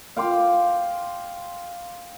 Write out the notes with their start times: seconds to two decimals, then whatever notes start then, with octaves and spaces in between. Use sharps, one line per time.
0.16 F5 G5 C6 D6